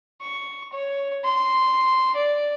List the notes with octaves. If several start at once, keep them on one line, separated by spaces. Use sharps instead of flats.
C#6
C#5
C6
D5